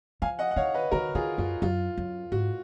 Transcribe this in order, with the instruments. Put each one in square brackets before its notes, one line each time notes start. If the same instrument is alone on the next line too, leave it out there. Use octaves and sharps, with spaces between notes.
[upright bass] F3 [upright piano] F5 G#5
[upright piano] D#5 F#5
F#5
[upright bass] D#3 [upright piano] C#5 F5
[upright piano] B4 D#5
[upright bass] D#3 [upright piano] F#4 A#4
[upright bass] D#3 [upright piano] F4 G#4
[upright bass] F#2 [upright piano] F4
[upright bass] F#2 [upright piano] F4
[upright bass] F#2
[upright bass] G#2 [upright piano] F#4